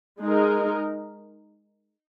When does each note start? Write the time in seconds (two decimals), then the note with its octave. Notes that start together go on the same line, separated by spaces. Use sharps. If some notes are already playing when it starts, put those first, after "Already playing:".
0.21 G#3 D#4 A#4